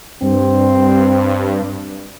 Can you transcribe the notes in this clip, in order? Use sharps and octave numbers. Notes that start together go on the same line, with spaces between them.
G2 C4